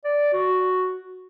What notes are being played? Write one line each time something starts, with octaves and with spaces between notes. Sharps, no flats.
D5
F#4